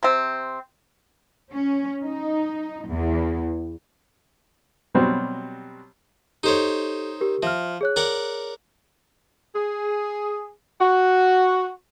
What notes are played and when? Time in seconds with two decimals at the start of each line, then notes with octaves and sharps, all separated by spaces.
0.03 C3 C4
1.52 C#4
2.04 D#4
2.89 E2
4.95 B2 F#3 G3 C4
6.43 D#4 G4 A4 C5 C#5
7.21 G4 A#4
7.43 F3 E5 F6
7.81 G#4 C#5 F#6
7.96 A#4 D5 F#5
9.55 G#4
10.81 F#4